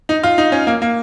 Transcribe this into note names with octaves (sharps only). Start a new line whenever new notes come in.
D#4
F4
D#4
C#4
A#3
A#3